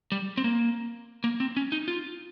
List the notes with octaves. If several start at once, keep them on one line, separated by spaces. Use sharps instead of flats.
G3
C4
A#3
A#3
C4
C#4
D#4
F4